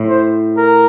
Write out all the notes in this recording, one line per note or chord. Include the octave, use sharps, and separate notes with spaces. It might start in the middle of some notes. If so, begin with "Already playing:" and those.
Already playing: A2
C5
A#4